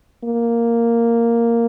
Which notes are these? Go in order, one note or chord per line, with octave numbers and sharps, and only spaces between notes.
A#3